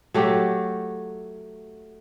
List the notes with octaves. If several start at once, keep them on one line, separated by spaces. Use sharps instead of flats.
F#3 A3 G4